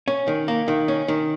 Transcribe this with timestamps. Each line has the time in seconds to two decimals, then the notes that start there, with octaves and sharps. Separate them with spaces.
0.08 C#4
0.28 D#3
0.48 A#3
0.68 D#3
0.88 C#4
1.08 D#3